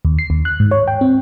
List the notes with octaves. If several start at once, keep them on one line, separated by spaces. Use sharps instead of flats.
D#2
C7
D#2
F#6
G#2
C#5
G5
C4